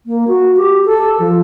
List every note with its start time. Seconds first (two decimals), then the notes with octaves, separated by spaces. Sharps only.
0.06 A#3
0.28 F#4
0.57 G4
0.85 A4
1.19 F3